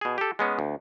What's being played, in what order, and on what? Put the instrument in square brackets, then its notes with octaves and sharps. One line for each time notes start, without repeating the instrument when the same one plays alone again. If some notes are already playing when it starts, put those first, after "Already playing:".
[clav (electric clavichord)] B2 G#4
G4 A4
G#3 B3 C#4
D2